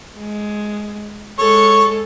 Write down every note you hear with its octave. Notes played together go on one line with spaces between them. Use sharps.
G#3
G#3 A4 C#5 C#6